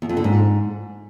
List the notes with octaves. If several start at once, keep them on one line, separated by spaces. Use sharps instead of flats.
E2
F2
D3
G#2